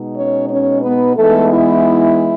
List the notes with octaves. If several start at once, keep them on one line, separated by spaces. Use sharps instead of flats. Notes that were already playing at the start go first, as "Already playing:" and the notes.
Already playing: B2 G#3 D#4
C#4 C#5
C#4 C#5
B3 B4
E3 G#3 A3 B3 D#4 A4
E4